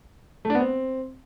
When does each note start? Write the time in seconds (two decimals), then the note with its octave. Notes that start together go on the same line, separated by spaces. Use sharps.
0.45 A3
0.50 D4
0.55 B3
0.60 C4